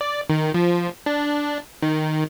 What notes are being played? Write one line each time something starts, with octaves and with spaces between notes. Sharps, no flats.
D5
D#3
F3
D4
D#3